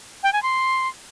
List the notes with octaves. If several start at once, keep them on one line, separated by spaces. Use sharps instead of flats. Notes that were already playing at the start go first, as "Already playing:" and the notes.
G5
G#5
C6